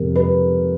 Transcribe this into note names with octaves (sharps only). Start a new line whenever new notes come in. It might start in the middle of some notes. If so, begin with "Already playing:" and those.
Already playing: F2 C3 F3 A#4
B4